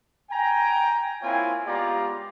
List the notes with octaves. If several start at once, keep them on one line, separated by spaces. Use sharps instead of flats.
G5 G#5 A#5
A#3 C4 E4 F4 C#5 G#5
G#3 B3 F4 G4 D5 A#5